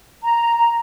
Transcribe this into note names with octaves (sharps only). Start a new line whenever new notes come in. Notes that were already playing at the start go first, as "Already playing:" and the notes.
A#5